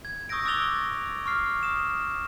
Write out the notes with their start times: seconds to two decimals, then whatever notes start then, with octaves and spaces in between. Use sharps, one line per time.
0.05 G#6
0.29 C#6 D#6 E6 G6 A#6 D7
0.45 D6 E6 F#6 A6 F7 G7
1.25 C#6 D6 F6 C7
1.63 D#6 E7